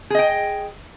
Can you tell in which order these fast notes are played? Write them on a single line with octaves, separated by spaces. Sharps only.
G#4 D#5 G5